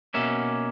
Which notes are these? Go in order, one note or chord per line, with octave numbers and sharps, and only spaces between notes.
B2 A#3 C#4 E5